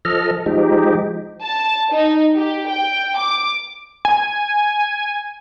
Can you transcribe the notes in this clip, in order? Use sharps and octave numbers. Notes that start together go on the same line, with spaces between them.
F3 A4 D#5 F6
F3 G#3 D#4 G4
A5
D#4
G4
G5
D6
G#5